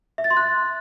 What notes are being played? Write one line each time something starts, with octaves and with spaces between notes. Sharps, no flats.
E5
A6
C6
F#6